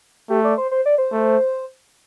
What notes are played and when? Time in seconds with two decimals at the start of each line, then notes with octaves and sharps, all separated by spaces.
0.30 A3 G4
0.44 D5
0.58 C5
0.71 C5
0.86 D5
0.98 C5
1.12 A3